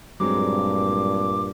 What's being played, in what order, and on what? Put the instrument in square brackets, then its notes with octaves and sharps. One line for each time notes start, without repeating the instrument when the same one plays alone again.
[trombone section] G2 A#2 [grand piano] F#3 G#3 C4 [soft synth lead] D6